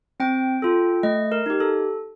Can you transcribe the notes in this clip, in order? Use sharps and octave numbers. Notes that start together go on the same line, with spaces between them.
C4 G5
F4 A4
A3 D#5
A#4
D#4 G4
A4